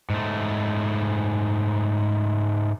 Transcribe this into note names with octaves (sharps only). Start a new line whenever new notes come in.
G#2 A3